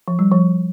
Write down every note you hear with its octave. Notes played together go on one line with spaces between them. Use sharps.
F3
G3
F3